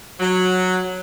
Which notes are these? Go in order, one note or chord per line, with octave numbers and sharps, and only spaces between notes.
F#3